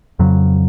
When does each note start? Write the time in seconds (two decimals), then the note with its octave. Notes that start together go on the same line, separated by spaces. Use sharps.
0.19 F2 C#3 F#3